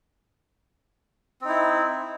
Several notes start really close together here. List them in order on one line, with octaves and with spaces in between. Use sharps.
C4 D#4 E4